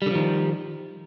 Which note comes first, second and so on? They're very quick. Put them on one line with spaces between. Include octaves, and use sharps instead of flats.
G3 D3 F3 D#3